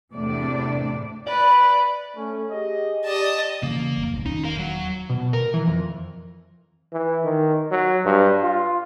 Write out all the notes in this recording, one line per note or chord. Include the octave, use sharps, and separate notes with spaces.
E2 A2 C3 D4 D5
B4 D5
A3 C#4
G4 G#4 D#5
G4 D5 D#5 A5
C#3 E3 A#3
F1
D1 A#1
E1 D#2 C#4 D#4
A#4 F5
F#3
B2
A#4
E3
F2
E3
D#3
F#3
G2
F4